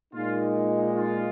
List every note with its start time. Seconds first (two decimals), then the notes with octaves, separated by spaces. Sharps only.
0.13 A#2 G#3 D#4 F4
0.96 F4